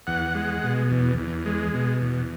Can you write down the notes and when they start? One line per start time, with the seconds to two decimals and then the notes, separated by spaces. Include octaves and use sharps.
0.07 E2 F#5
0.35 G#3
0.63 B2
0.91 E2
1.18 E2
1.46 G#3
1.74 B2
2.01 E2